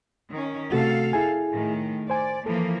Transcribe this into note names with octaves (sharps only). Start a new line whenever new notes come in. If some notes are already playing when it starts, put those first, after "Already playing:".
D#3 C#4
C3 A3 F#4 A4 F5
E4 G#4 G#5
A2 D#3
C5 D5 G#5
E3 F3 A#3 A4